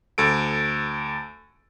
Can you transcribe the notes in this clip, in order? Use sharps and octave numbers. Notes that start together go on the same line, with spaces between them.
D2 A4 D7